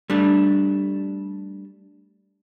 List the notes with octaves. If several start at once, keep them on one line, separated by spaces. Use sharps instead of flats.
G3 A3 D4